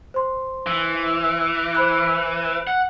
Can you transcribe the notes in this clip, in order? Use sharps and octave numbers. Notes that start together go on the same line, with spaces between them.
C5 C6
E3
C5 B5 F#6
F#5